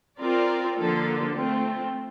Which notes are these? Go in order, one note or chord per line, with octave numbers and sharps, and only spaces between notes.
C4 F4 A#4 D5
D3 F3 A#3 F4 A4
A3 C4 F4